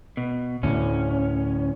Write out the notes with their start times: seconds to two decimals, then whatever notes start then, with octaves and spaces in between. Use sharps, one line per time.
0.17 B2
0.63 D2 A2 D3 C#4